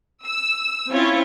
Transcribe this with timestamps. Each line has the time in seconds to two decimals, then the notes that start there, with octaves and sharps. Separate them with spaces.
0.24 E6
0.91 C4 C#4 E4 F4 C#5